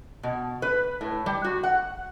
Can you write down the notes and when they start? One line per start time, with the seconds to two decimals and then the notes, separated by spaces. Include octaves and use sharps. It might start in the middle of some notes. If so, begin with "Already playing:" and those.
0.23 B2
0.62 B4
1.01 A2
1.26 G3
1.44 F#4
1.63 F#5